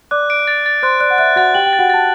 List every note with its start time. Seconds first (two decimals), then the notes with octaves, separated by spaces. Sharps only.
0.11 D5 D6 F#6
0.30 D7
0.47 A6
0.66 A6
0.83 C5 C6 F#6
1.00 D5 F#6
1.10 F#5
1.18 E5 F#6
1.36 F#4 F#5 A6
1.54 G4 G5 F#7
1.66 G5
1.73 A6
1.79 F#4 F#5
1.90 A5 A6